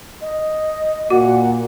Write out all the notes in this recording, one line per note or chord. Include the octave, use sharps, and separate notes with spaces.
D#5
A#2 F#4 F#5